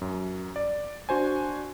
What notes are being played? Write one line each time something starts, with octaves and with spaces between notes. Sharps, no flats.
F#2 F#3
D5
D4 F#4 C5 G#5